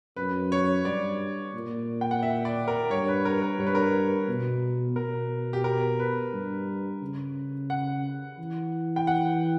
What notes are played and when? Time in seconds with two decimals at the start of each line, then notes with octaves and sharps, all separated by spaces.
0.16 F#2 B4
0.52 C#5
0.85 G2 D5
1.54 A#2
2.01 G5
2.11 F#5
2.23 E5
2.45 D5
2.68 A#4
2.91 G2 C#5
3.08 B4
3.25 A#4
3.42 A#4
3.59 G2 C#5
3.67 B4
3.75 A#4
3.82 B4
4.28 B2
4.96 B2 A#4
5.53 G4
5.64 A#4
5.99 B4
6.33 G2
7.01 C#3
7.70 F#5
8.38 E3
8.96 G5
9.07 F#5